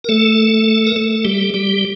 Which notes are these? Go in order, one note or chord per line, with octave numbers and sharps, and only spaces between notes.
A#4
A3 A4
A#4
A3 A4
G3 G4
G3 G4